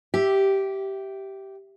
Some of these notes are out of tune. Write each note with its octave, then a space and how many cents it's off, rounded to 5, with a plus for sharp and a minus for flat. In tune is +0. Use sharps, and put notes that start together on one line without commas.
G4 -10 E5 +0